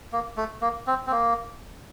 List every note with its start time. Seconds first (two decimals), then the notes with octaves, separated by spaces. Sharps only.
0.12 A#3
0.37 A3
0.61 A#3
0.87 C4
1.07 C4
1.11 A#3